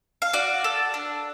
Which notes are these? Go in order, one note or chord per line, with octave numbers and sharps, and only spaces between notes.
F5
F#4 D5
A4
D4